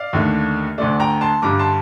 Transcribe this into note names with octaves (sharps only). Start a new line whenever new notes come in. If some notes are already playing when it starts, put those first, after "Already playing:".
Already playing: D5 F5
D#2 D3 A3
D2 D3 A3 D5
G5 A#5
A5 C6
G2 D3 G3 A#5 D6
A5 C6